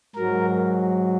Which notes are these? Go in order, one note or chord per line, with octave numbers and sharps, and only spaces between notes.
G#2 F#3 A#4